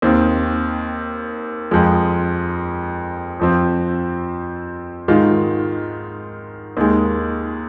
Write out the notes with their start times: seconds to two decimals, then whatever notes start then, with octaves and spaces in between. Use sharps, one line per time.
0.02 D#2 D#3 C4
1.71 F2 F3 G#3
3.39 F2 F3 C4
5.08 G#2 D#3 G#3 F4
6.77 D#2 D#3 G#3